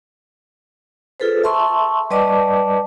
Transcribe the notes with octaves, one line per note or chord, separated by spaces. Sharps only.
F4 G#4 A4 B4 C5
E5 A5 C6 C#6 E6
G3 B4 D5 D#5 A5 D6